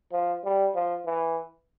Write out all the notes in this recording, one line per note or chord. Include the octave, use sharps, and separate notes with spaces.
F3
G3
F3
E3